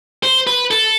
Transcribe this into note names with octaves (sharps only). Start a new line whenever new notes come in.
C5
B4
A4